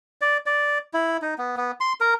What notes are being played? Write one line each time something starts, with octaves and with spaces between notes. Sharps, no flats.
D5
D5
E4
D#4
B3
B3
C6
A#4